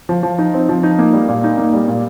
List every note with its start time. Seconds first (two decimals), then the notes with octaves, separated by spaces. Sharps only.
0.09 F3
0.23 F3
0.39 D#4
0.54 C4
0.69 F3
0.83 D#4
0.99 A#3
1.13 G3
1.29 A#2
1.44 D#4
1.58 A#3
1.73 G3
1.88 A#2